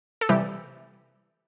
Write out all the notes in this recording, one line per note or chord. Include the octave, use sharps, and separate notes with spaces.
A4
C3 E3 G3 G4